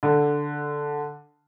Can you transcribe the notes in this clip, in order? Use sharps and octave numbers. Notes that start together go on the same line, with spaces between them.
D3